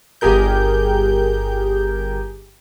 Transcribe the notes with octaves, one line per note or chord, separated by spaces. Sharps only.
G1 G4 G#4 A#4 G6